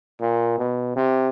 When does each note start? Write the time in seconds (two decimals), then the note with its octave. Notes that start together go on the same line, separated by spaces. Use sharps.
0.20 A#2
0.58 B2
0.96 C3